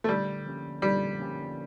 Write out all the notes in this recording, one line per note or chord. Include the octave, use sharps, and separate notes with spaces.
A3
D3 G3
F3 A#3 C#4 G4
D3 G3
F3 A#3 C#4 G4